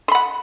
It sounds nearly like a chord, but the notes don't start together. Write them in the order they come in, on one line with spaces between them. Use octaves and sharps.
C6 B5 F#5